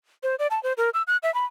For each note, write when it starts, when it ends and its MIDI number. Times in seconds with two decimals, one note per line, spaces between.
0.23 0.35 72
0.39 0.47 74
0.51 0.62 81
0.63 0.73 72
0.77 0.90 70
0.94 1.02 88
1.07 1.17 90
1.23 1.33 76
1.34 1.45 83